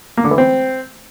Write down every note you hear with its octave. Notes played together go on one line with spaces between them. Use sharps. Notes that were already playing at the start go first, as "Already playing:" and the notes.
A#3
D3
E3
C4